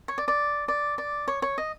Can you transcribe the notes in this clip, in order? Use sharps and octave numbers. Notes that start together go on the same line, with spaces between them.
C#5
D5
D5
D5
D5
C#5
C#5
D#5